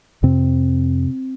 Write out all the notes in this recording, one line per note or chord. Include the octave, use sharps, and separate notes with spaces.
F2 C3 C4